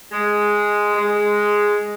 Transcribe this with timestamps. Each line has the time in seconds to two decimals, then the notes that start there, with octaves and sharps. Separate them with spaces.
0.11 G#3
0.94 G#3